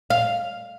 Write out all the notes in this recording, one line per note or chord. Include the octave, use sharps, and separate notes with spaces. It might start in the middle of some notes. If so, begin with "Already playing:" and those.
F5